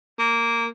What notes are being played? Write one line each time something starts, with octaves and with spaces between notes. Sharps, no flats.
A#3